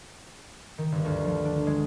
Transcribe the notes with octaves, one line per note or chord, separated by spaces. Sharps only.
D#3
G1
D2
F3
D4
G#3